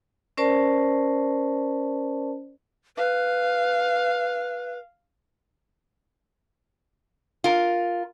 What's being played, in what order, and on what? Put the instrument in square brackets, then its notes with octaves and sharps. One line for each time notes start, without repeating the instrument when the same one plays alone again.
[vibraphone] C#4 A#4 C5 D5 A5
[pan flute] B4 [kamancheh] F5
[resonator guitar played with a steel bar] F4 A#4